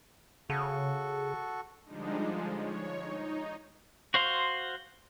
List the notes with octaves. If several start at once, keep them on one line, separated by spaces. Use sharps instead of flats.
C#3 F#4 A4 C#6
D3 F3 G3 G#3 D4 D#4
F3 G#3
C#5
D#4
F#4 C5 F5 C6